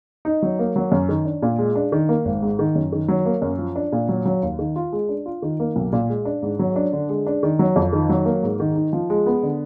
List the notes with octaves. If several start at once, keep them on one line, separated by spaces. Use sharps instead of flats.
D#4
F#3
A#3
F#3
F#2
D#3
D4
A#2
G#3
D4
D#3
A#3
G#1
G#2
D#3
F#2
D#3
F#3
A#3
F#2
F3
D4
A#2
F#3
F#3
D#2
D#3
F4
G#3
D4
F4
D#3
A#3
B1
A#2
G#3
D4
G#2
F#3
D4
D3
G#3
D4
D#3
F#3
F2
D#3
F#3
A#3
G#2
D#3
D#4
F3
G#3
B3
D3